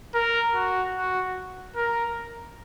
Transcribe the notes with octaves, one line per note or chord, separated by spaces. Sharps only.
A#4
F#4
F#4
A#4